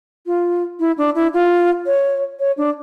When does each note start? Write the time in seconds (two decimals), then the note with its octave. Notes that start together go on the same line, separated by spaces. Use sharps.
0.26 F4
0.79 E4
0.98 D4
1.15 E4
1.33 F4
1.86 C#5
2.39 C#5
2.57 D4